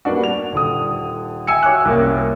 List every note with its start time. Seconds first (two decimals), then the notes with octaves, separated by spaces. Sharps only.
0.05 G3 A#3 B3 D4 F#4
0.24 F7
0.53 D#1 D3 D#6
1.47 E5 G5 G#5 E6 C#7
1.63 F#4 C#5 G#5 D6 F#6
1.85 C2 A#3 C#4